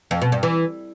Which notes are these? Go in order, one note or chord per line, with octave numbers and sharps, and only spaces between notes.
F2
B2
G2
E3